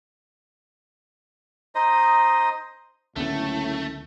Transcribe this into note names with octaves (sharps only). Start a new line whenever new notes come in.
D#4 C5 D#5 D#6
F#1 C#2 A2 D3 A3 B3